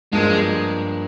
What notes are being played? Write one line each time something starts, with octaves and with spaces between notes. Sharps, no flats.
G2 F3 G#3 A#3